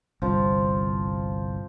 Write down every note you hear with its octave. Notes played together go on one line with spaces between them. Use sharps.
G1 C2 F3 C5